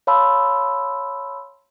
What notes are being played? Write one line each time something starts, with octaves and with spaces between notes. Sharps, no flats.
C#5 F5 A5 B5 C6 E6